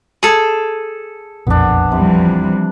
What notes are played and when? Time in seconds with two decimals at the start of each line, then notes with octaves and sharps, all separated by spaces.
0.23 G#4 A4
1.47 E1 A#1 F2 B3 D4
1.92 C3 E3 F3 G3